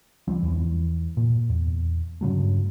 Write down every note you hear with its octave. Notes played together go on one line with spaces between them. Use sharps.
C#2 F3 G3 C4
E2 E3
A#2
E2
G2 C#3 F#3 A3